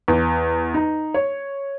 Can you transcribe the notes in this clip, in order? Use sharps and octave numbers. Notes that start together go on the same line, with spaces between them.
E2
D#4
C#5